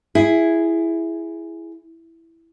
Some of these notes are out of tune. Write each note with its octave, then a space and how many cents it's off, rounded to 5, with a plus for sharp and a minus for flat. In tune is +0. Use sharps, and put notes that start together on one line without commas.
E4 +10 G#4 +0